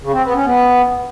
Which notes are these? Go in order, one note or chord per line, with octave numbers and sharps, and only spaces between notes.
C#3
C4
B3
C#4
B3